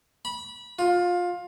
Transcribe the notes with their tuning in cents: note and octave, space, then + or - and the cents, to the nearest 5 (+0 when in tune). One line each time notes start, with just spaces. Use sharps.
B5 -20
F4 +20